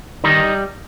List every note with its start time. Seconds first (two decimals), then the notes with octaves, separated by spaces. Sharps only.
0.24 D#3 G3 D#4